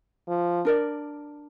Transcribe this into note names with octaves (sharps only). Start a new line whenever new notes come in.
F3
D4 A#4 D5